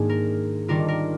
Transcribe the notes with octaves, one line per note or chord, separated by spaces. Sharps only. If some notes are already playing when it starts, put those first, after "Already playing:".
Already playing: G#2 D#3 A#3 D4 G#4
A#4
D#3 G3 D4 F4 A#4
A#4